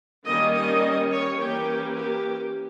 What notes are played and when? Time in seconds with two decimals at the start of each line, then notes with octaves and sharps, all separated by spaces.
0.25 D#3 G3 A#3 C#4 D#5
0.54 D#5
1.10 C#5
1.38 E3 A#3 C#4 G4
1.94 G4